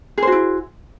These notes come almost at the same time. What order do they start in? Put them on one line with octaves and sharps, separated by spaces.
G#4 C5 F#4 E4